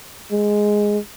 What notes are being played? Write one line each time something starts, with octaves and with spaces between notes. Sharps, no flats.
G#3